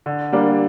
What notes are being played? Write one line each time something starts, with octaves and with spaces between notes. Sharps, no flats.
D3
G3 A#3 D4